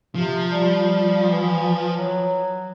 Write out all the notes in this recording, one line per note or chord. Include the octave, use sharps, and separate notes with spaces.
C3 F3
G3
E3
F#3